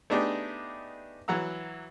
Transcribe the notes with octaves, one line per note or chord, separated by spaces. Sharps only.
A3 B3 D4 D#4 G4 G#4
E3 F#3 F#5 A#5 E6